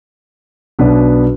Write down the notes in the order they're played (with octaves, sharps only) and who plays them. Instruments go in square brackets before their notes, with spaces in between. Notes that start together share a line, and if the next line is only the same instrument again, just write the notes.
[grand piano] B1 B2 B3 D4 B4